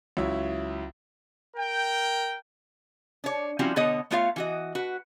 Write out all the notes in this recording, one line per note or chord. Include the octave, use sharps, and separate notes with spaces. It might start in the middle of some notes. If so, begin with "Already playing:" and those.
C#2 F#3 E4 C#5 E5
A#4 G5
D4 C#5
F3 G3 C4 C#4 E4 F#4
B2 D3 B3 A4 C#5 D#5
A3 B3 D4 F4 C#5 F5
E3 F#4 D#5
F#4 B4